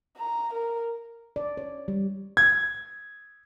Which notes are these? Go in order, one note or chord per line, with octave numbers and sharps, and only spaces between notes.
A#5
A#4
D5
C#5
G3
G#6